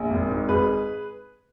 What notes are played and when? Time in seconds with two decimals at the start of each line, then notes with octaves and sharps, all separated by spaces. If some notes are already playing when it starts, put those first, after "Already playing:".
Already playing: A#1
0.10 G#1
0.30 G#2
0.48 G#1 G#4 B4